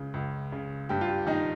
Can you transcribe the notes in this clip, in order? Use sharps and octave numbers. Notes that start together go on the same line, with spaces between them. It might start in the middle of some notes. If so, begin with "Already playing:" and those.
Already playing: C#2 C#3
C#2
C#3
G2 G4
F4
G4
D#3 D#4